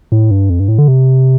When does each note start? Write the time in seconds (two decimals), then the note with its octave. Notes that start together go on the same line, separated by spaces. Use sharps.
0.12 A2
0.31 G2
0.50 F2
0.59 G2
0.68 A2
0.78 D3
0.88 C3